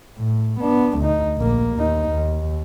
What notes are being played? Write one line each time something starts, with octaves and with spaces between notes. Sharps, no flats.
A2
B3 D4
D2 D#4
A#1 A#3
D#2 D#4
D#2